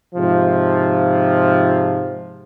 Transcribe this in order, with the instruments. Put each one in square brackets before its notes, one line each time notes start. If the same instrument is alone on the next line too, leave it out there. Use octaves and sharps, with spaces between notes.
[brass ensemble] G#2 C3 F3